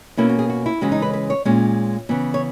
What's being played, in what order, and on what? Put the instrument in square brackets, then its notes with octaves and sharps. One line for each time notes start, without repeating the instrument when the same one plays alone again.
[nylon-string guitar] B2 A#3 C#4 E4
F#4
G#4
F#4
E4
C#3 E3 G#3 C#4 F#4
D#4
B4
B4
C#5
A#2 G#3 C#4 C#5
C#3 E3 B3
C#5